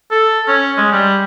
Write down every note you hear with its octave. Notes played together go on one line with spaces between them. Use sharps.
A4
C#4
G#3
G3